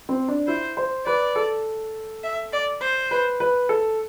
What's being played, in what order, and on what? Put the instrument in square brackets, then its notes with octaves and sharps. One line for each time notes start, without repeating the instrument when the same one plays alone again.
[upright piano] C4
D4
[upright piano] E4 [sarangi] C5
[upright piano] C5
[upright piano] B4 [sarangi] D5
[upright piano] A4
[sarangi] E5
D5
C5
[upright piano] B4
B4
A4